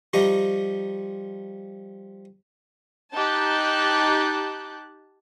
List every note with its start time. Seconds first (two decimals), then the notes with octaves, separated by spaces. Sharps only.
0.13 F3 G3 D#4 G4 A#5 C#6
3.14 D#4 G4 A5 F#6 G6